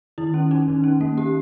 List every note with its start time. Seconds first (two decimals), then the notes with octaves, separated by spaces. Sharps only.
0.18 D#3 E4
0.34 C#4
0.51 C#4 D#4
0.68 D#3
0.84 C#4
1.01 A#3
1.17 A#3 G4